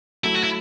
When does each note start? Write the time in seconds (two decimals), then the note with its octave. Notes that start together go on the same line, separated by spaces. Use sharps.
0.24 F#3 A3 E4
0.35 F#4
0.43 E4